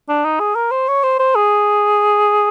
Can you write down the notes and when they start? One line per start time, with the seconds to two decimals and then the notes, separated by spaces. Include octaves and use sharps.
0.09 D4
0.25 D#4
0.40 G#4
0.55 A#4
0.71 C5
0.88 C#5
1.03 C5
1.19 C5
1.35 G#4